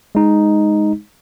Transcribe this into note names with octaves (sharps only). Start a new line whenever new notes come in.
G#3 D#4